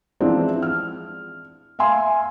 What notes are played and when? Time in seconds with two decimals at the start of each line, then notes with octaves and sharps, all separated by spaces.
0.20 E3 F3 G#3 C4 D4
0.62 F6
1.79 E5 F5 G#5 C6